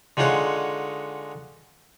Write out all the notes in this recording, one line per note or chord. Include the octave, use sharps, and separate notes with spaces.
D3 G#3 D#4 F4 C#5 F#5